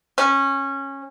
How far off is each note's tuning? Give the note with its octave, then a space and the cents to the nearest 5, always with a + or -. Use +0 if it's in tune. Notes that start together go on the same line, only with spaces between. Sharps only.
C#4 -15